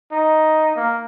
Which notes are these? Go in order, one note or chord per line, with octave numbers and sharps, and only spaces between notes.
D#4
A#3